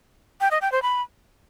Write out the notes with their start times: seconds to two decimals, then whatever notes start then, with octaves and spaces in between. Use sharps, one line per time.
0.41 G5
0.51 D#5
0.62 G5
0.72 C5
0.82 B5